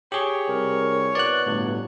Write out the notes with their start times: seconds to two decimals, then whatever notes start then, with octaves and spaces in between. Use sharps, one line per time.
0.12 G4 G#4 C#5
0.48 C2 A#4
1.15 B2 D5 F#6
1.46 G1 A2